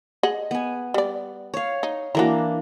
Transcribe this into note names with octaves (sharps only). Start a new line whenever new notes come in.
G#4 D#5 F#5
B3 G#5
G3 D5
C#5 F5
D#4
E3 A#3 D4 F#4 A#4 A#5